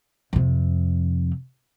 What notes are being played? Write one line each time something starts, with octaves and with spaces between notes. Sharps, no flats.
F2 C3